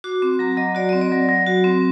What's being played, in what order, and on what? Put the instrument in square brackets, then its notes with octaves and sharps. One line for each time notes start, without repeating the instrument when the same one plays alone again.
[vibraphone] F#4 D6
C4 D6
F#3 A#5
F#3 D#5
F#4 D5
C4 D#5
D5
F#3
F#3
F#4
C4